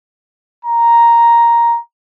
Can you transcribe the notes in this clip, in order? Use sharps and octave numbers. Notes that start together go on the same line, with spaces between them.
A#5